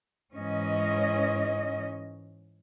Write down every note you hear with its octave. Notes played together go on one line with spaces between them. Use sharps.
G#2 E3 C#4 D#5